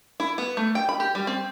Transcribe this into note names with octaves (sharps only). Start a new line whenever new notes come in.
E4
B3
A3
G5
B5
G4
G3
C4